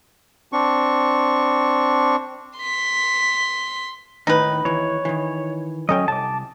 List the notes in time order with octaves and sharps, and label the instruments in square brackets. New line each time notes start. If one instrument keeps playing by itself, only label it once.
[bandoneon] C4 D4 C#6
[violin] C6 B6
[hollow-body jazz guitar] D#2 A2 D#3 [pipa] D#4 B4
[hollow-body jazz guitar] D#2 E3 [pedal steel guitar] C#5
[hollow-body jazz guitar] D#3 E3
[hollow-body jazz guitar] F#3 A4 G5 [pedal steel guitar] C#4 D#5
[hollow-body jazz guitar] C2 [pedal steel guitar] A5 D6